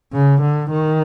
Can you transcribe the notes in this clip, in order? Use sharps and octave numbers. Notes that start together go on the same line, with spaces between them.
C#3
D3
D#3